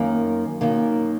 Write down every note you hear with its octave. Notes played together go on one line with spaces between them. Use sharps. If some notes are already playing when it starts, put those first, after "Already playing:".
Already playing: F#2 D#3 A#3
F#2 D#3 A#3